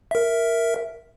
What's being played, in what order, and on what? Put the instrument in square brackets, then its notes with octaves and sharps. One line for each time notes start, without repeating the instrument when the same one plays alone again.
[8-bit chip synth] A#4 E5